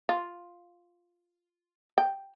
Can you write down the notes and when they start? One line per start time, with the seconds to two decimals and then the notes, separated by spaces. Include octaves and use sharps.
0.09 F4
1.98 G5